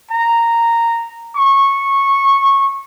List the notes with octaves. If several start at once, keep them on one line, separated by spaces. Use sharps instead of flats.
A#5
C#6